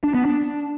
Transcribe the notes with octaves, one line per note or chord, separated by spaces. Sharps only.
D4
B3
D4